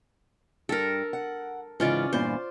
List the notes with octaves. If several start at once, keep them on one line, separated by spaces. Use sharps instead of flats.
G2 A4 A#4
F#5
G#2 C#3 E3 C#4 F4 D5
E2 G2 A#2 C5